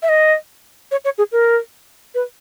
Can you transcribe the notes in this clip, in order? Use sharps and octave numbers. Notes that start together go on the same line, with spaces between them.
E5
D#5
C#5
C#5
G#4
A#4
B4